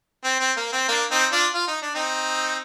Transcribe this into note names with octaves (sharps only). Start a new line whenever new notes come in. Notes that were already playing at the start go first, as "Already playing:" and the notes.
C4
C4
A#3
C4
A#3 D4
C4 D#4
D4 F4
F4
D#4
D4
C4 D#4